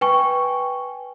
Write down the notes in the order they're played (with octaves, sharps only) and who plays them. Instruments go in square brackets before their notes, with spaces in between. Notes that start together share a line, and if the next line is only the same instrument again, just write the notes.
[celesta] B4 G5 G#5 C#6